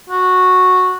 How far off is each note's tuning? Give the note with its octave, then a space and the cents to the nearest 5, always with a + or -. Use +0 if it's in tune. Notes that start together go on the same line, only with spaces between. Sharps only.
F#4 -10